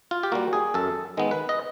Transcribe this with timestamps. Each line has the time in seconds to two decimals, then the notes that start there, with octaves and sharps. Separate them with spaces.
0.11 F4
0.23 G4
0.32 G3 A#3 F#4
0.53 G#4
0.74 F#2 A4
1.17 D#3 G#3 B3
1.31 B4
1.49 D#5